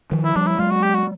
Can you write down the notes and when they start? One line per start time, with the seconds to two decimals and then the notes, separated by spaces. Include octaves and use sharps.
0.12 D#3 F3
0.24 E4
0.36 F3 G3 D4
0.47 E4
0.59 F#3 G#3 F4
0.70 F#4
0.83 G4
0.95 F#4